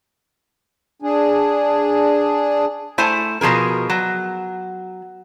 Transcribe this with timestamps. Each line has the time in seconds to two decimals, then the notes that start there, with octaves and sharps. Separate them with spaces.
1.02 D4 G#4
2.98 A3 E4 C5 G#5
3.41 B2 F3 G#4 A#4
3.90 F#3